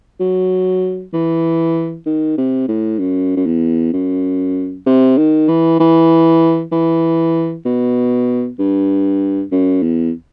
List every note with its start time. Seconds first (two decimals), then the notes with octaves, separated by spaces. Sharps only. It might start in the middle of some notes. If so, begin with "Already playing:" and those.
0.20 F#3
1.13 E3
2.06 D#3
2.38 C3
2.68 A2
2.99 F#2
3.36 F#2
3.46 E2
3.93 F#2
4.86 C3
5.17 D#3
5.49 E3
5.80 E3
6.72 E3
7.65 B2
8.59 G2
9.52 F#2
9.83 E2